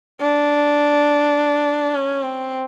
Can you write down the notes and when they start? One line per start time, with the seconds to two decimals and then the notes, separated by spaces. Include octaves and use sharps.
0.20 D4
1.94 C#4
2.23 C4